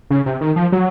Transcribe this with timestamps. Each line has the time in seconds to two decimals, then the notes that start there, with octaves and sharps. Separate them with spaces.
0.11 C#3
0.26 C3
0.41 D#3
0.56 F3
0.72 F#3